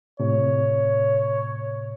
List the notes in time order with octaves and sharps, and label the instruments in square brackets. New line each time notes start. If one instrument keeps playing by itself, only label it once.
[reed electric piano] A2 C3 [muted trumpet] C#5